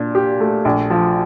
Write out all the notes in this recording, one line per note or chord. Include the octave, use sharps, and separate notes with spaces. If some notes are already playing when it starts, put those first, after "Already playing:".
Already playing: A#2 D4
G4
A3
A#1
F3